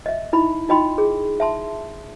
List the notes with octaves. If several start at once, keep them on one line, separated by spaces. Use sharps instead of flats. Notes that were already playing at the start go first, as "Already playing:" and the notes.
D#5 E5
D#4 E4 B5
D#4 F4 D#5 G5 B5 C6
G#4
E5 A5 C6